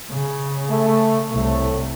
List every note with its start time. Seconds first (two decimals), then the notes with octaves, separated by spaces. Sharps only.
0.12 C#3
0.70 A3
1.32 C2 A2 A3